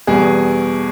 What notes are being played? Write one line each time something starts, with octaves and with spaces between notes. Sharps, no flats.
E2 B2 G3 B3 G#4